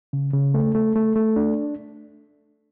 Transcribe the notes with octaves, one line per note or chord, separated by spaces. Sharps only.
C#3
C#3
A3
A3
A3
A3
D4